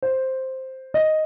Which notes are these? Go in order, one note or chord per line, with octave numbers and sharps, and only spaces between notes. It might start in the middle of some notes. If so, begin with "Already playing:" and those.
C5
D#5